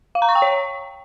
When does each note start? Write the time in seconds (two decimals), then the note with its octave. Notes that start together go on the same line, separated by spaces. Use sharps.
0.15 F5
0.22 A#5
0.29 C#6
0.35 G5
0.42 C#5